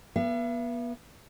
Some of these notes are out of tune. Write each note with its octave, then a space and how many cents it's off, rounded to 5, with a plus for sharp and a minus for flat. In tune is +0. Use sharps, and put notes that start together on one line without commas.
B3 -30 E5 +45